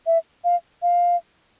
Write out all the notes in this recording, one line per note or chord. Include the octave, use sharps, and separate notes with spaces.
E5
F5
F5